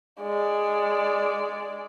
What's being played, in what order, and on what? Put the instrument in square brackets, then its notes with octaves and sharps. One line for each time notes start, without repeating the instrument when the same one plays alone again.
[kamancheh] G#3 D5